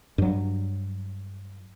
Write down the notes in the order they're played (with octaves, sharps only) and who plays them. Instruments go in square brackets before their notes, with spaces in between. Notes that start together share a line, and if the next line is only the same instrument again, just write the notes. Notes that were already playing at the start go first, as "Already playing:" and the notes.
[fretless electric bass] G2 F#3